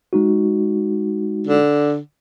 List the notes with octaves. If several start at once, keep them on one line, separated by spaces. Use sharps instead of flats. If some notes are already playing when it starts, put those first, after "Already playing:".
G#3 D#4 F#4
D3